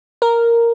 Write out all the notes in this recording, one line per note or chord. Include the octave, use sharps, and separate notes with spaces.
A#4